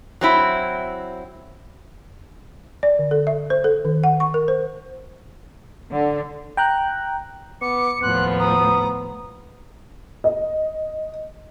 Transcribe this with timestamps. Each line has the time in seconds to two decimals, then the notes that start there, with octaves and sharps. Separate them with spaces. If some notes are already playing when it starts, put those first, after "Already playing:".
0.21 F#3 C4 E4
2.83 D5
2.99 D3
3.11 A4
3.27 E5
3.50 C5
3.64 A4
3.85 D#3
4.04 F#5
4.20 C#6
4.34 A#4
4.48 C5
5.92 D3
6.57 G5 A#5 F#6
7.61 B3 D6 C#7
8.02 D#2 A2 F3 B3 C6 F#6
8.39 A#5 D#6
10.24 D#5